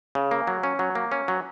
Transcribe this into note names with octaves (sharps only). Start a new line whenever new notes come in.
C#3
A#3
F#3
C#4
F#3
A#3
C#4
F#3